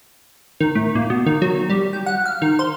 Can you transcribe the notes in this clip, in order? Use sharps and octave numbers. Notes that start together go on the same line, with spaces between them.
D#3
A2
A#2
B2
D#3
F#3
G3
G5
F#5
F5
D#3
C5